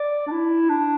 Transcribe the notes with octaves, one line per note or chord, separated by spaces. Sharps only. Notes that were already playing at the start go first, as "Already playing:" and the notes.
Already playing: D5
D4
E4
D4